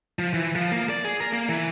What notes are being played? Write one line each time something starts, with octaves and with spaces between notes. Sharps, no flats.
F3
E3
F3
A#3
D5
G#4
A#4
A#3
E3